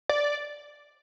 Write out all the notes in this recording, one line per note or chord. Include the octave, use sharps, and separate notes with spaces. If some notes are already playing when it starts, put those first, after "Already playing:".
D5